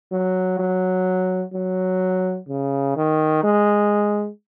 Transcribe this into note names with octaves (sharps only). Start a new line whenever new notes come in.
F#3
F#3
F#3
C#3
D#3
G#3